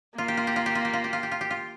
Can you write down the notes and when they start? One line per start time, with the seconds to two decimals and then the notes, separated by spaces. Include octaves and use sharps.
0.18 A#3 F4
0.28 G4
0.37 F4
0.47 G4
0.56 F4
0.66 G4
0.75 F4
0.85 G4
0.93 F4
1.04 G4
1.13 F4
1.23 G4
1.31 F4
1.41 G4
1.51 F4